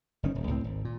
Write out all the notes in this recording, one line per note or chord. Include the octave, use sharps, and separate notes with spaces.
F#1 D#3 C#4
D#1
C#2 A2 C4
G#1
A#2